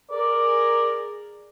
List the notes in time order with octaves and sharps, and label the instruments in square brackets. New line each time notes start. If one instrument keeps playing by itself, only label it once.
[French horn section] G#4 A#4 [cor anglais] D5